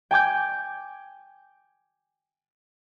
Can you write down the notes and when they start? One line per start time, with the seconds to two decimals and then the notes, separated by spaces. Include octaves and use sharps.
0.11 G5 G#5 D6 G6